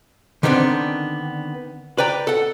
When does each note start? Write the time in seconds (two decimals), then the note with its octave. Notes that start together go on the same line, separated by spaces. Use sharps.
0.43 D3 D#3 G3 B3 C4 D4
1.98 B4 D5 G5 A#5
2.27 A4 F#5